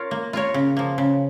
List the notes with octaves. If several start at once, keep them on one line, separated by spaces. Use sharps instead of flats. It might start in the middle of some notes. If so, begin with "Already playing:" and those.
Already playing: F4 A#4 C#5
A#3
F4 A#4 C#5
C#3
F3 A#3
C#3